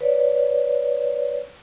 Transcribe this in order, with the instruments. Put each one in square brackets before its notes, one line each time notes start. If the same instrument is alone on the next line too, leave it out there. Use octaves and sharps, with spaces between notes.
[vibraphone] B4 C#5 D5